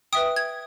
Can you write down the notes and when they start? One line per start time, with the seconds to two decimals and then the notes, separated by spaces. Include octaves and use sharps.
0.13 B4 E5 G5 D#6
0.36 G#6